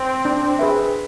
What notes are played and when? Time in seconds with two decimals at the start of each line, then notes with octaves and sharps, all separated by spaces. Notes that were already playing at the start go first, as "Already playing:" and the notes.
Already playing: C4
0.25 D4
0.59 G#4 B4 E5